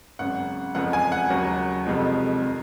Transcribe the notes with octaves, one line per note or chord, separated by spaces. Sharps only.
G#1 F#2 C#3 F#5
F#1 F2 C#3 F3 F#5
G#5
F#5
D#2 C#3 F#3 A#3
F1 F2 C3 F3 G#3
D#3